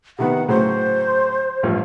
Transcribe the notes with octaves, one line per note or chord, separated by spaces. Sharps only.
C3 D#3 B3 F#5
A2 C#3 F#3 C5
A1 G2 F3